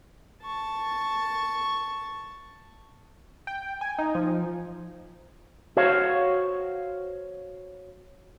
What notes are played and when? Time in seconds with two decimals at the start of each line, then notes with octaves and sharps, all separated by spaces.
0.43 A5 C#6
3.47 G5
3.81 G#5
3.99 D#4
4.15 F3
5.77 F#4 C5 C#5 F5